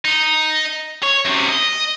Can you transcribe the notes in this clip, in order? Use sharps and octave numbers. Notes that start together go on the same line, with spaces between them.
D#4
C#5
F#2 C3
D#5